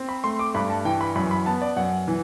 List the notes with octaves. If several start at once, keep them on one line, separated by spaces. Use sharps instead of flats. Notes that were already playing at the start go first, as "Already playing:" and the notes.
Already playing: C4
B5
A3 C6
D6
G2 B5
A5
E3 G5
B5
F#2 B5
B5
B3 A5
D5
F#2 F#5
E3